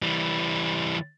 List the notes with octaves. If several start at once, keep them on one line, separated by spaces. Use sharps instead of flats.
E3 G3